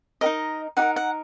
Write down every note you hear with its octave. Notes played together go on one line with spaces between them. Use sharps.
D#4 G4 A#4 D#5
D#4 G4 F#5
A#4
F#5